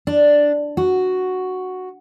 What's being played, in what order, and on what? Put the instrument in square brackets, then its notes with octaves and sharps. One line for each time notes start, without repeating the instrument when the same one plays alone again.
[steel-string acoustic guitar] D4
F#4